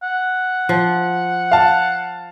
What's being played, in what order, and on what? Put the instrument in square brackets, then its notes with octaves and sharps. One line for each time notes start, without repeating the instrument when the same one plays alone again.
[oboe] F#5
[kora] F3
[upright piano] F5 A5